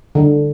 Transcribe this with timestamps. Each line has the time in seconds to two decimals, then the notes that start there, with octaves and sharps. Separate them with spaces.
0.15 D3